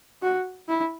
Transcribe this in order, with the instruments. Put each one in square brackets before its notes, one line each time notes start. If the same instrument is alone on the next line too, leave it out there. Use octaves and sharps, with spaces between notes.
[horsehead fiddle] F#4
E4